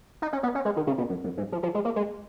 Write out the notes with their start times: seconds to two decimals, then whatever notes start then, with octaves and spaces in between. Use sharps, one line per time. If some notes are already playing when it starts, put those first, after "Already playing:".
0.22 D#4
0.33 C#4
0.43 B3
0.55 C#4
0.65 G#3
0.76 D#3
0.87 C#3
0.98 B2
1.09 F#2
1.24 F#2
1.37 G#2
1.52 F3
1.63 F3
1.75 G#3
1.85 A#3
1.96 G#3